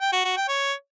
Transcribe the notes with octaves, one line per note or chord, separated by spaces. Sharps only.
G5
F#4
F#4
G5
C#5